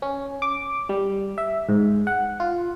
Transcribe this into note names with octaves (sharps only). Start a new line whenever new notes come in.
C#4
D6
G3
E5
G#2
F#5
F4